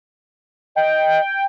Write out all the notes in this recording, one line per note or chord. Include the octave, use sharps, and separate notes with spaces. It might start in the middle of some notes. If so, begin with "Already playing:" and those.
D#5 G5